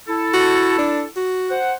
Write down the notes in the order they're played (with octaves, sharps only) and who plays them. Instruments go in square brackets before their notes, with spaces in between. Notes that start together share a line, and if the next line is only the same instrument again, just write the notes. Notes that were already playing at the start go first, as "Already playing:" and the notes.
[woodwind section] E4 A4
[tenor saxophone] F#4
D4
F#4
[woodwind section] C5 F#5